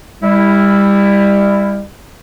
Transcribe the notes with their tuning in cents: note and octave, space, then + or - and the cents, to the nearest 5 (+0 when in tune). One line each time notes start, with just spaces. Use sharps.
G3 +30 E4 +0